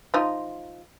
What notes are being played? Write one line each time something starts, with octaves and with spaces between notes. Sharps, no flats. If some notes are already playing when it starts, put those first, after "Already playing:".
F3 D#4 F4